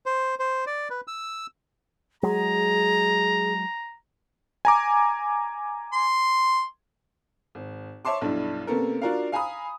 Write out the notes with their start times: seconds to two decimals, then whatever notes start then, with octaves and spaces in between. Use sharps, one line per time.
0.06 C5
0.39 C5
0.66 D5
0.90 B4
1.08 E6
2.23 F#3 G#3 G#4 A#5
4.65 G#5 A#5 D6
5.93 C6
7.55 G#1
8.05 C#5 E5 A5 C6 D6
8.21 B1 G2 D4 E4
8.67 C3 A#3 B3 C#4 A4 A#4
9.02 D4 F4 F#4 A#4 D5 F5
9.32 F5 G#5 A#5 B5 D#6